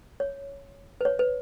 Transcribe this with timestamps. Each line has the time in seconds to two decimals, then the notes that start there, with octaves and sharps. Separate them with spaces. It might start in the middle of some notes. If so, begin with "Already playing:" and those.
0.20 C#5
1.01 B4
1.05 C#5
1.19 B4